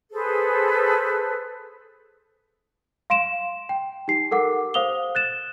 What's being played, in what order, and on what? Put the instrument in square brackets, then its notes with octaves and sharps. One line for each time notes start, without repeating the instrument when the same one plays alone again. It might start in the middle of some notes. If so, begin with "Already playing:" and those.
[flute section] G#4 A4 B4 C5
[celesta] F5 C6 D7 E7
G5
D#4 G4 C7
G4 A4 A#4 F#5 D6
C5 F5 D#6 F7 G7
F#6 A6 E7